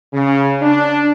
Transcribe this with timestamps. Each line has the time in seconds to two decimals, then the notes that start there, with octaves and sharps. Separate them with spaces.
0.14 C#3
0.62 D4